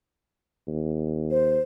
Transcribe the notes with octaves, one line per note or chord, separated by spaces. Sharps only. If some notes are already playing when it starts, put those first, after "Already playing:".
D#2
C5